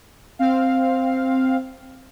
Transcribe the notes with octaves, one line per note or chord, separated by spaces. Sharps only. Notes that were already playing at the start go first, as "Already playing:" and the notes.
C4 F5